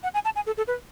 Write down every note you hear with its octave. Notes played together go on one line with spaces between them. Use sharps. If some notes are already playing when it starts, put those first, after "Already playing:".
F#5
G#5
A5
G#5
A4
A4
B4